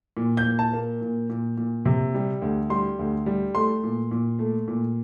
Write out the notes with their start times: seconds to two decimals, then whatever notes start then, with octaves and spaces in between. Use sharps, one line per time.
0.17 A#2
0.37 G6
0.45 A#2
0.59 A5
0.73 A#3
1.01 A#2
1.30 A#2
1.57 A#2
1.85 C3
2.14 G3
2.42 D2
2.70 G3 C6
2.99 D2
3.26 G3
3.55 A3 C6
3.84 A#2
4.11 A#2
4.39 A3
4.68 A#2